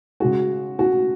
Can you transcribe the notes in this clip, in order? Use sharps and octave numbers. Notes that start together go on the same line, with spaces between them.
C#3 G#3 F#4
F#4